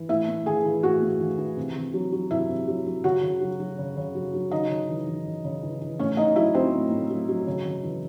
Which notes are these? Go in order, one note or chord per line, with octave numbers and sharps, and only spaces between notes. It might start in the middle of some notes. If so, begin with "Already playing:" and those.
Already playing: E3
A2 E4 E5
A2
E3 G#4 G#5
E3
A2 F#4 F#5
A2
E3
E3
C3
C3
F#3
F#3
C3 E4 E5
C3
F#3
F#3
C#3 F#4 F#5
C#3
F#3
F#3
C#3
C#3
F#3
F#3
C#3 D#4 D#5
C#3
E3
E3
C#3
C#3
E3
E3
A2 C#4 C#5
A2 D#4 D#5
F#3 E4 E5
F#3 C4 C5
A2
A2
F#3
F#3
C#3
C#3
E3